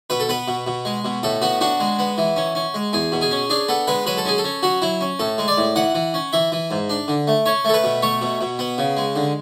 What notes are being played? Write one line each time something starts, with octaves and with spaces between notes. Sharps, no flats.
B2 B4
A4
B3 B4
B2
B2
G#3
B2
A2 A4
B3 F#4
D4 F#4
G#3
B3
E3
C#4
C#4
G#3
E2 G#4
B2
G#4
C#4
D4 G#4
B3 A4
G#3 B4
F#3 B4
A4
C#4 G#4
A4
C#4
F#3 F#4
F#3 E4
C#4
A2 A4
G#3
D5
A2
E3 F#5
E3
C#4
E3 E5
E3
G#2
D4
D3
A3
C#4 C#5
A3 A4
B4
B2
A3 C#5
B2
B2
B3
C#3
G#3
D3